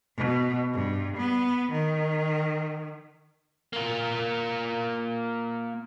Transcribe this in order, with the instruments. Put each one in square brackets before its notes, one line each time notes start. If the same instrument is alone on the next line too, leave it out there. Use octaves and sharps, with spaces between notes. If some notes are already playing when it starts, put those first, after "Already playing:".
[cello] B2
G2
B3
D#3
[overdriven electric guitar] A#3 F4